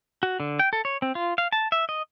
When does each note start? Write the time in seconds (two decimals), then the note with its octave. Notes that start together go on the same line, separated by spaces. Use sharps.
0.23 F#4
0.40 D3
0.59 G5
0.73 A4
0.85 C#5
1.02 C4
1.15 F4
1.38 F5
1.52 A5
1.72 E5
1.89 D#5